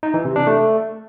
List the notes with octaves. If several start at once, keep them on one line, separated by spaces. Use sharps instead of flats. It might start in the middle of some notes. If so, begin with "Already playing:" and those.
D#4
E3
C3
D4
A3